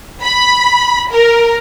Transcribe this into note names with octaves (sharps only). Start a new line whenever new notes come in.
B5
A#4